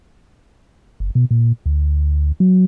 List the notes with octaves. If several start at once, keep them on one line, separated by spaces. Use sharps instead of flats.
F#1
B2
A#2
D2
F#3